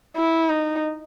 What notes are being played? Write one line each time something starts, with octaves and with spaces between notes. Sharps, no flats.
E4
D#4